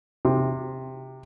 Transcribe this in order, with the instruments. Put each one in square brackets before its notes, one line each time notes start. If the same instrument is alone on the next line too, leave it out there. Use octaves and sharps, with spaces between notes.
[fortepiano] C3